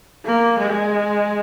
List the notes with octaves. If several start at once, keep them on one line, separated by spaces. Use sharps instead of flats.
A#3
G#3